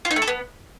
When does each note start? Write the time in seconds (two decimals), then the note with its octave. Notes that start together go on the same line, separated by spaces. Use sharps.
0.05 F4
0.11 D#4
0.16 A3
0.22 A4
0.28 B3